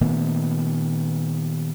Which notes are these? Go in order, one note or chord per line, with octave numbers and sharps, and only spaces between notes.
A#2 D#3 A3 B3